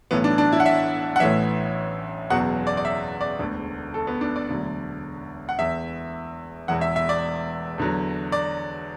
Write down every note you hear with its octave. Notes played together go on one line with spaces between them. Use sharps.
B1 A2 E3 B3
D4
D4
E4
F#5
E5
F#5
A1 A2 E3 E5
F#1 E2 B2 F#3 F#5
D5
D5
E5
D5
E1 D2 D3
A4
B3
D4
D5
E1 D2 D3 F#3
F#5
E2 E3 E5
E1 E2 E3 F#5
E5
E5
D5
E2 D3 F#3
D5